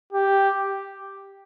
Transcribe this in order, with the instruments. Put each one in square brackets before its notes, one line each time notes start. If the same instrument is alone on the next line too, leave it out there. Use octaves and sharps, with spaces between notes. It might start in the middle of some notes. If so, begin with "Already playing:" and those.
[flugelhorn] G4